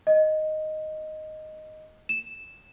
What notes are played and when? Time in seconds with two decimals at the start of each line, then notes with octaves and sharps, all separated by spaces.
0.07 D#5
2.09 E7